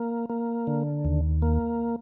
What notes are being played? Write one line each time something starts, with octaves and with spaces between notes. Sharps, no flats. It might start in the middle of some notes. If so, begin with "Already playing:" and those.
Already playing: A#3
A#3
D3
D#2
A#3